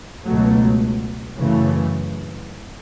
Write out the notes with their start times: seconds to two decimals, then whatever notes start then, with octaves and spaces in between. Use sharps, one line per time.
0.24 C#2 B2 F#3 A3
1.38 F#2 C#3 E3 A3